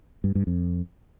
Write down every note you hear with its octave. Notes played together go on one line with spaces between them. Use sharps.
G2
G2
F2